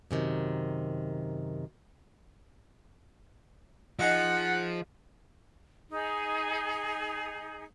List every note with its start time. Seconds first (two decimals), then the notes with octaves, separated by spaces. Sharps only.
0.11 F#2 C3 D#3
3.99 F3 D#4 G#4 D#5 F#5
5.91 D#4 G#4